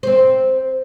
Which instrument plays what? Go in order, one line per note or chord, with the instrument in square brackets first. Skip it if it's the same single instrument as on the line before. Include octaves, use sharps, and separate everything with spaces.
[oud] C4 C5